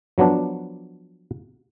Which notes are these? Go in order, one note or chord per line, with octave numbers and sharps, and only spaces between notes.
F3 F#3 B3 D4